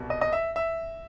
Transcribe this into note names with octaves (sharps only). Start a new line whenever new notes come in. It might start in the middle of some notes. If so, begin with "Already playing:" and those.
Already playing: C2 B2 G3
D#5
D#5
E5
E5